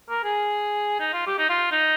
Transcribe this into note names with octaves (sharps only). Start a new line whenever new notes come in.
A#4
G#4
D#4
F4
G4
D#4
F4
D#4